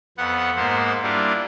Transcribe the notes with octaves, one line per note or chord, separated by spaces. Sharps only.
F2 B3 F#5
G#2 A#3 B3 C5
G3 A#3 D4 E4 F4